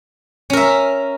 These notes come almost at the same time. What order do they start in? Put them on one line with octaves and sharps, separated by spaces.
C#4 A#4 E5